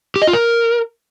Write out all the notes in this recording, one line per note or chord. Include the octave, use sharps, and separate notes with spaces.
G4
D#5
F4
A#4